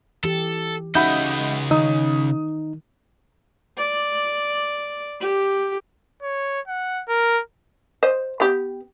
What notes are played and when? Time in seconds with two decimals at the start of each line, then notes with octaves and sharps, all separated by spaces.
0.24 E3 G4 A4
0.95 C#3 D#4 F#4 D#5 E5 F#5 B5 G6
1.71 D#3 D#4 D#6
3.77 D5
5.21 G4
6.23 C#5
6.68 F#5
7.08 A#4
8.03 C5 D#5
8.40 B3 G4